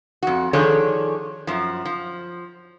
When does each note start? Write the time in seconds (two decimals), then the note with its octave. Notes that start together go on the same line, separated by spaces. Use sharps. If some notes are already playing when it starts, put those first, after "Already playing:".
0.23 F2 F#4
0.53 D#3 F3 D4 G#4 A4 C#5
1.47 F#2 F3
1.85 F3